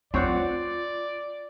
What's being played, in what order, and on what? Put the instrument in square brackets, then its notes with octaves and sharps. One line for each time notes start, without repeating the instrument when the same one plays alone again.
[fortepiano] C4 C#5 F#5 [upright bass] E4 F4 [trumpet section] D5